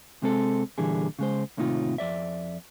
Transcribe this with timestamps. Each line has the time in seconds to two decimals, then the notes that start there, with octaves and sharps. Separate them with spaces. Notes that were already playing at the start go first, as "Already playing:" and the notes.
0.22 C3 G#3 C4 A4
0.78 A#2 D3 E3 G3 G#4
1.19 C#3 G#3 C5
1.57 D#2 A2 C3 D#4 F4
1.98 F2 D5 E5